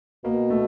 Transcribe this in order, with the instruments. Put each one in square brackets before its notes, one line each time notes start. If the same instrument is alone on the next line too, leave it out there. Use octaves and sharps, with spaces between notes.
[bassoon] B2 [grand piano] A#3
[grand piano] A3